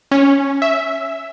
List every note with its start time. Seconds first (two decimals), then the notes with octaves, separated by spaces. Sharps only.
0.11 C#4
0.62 E5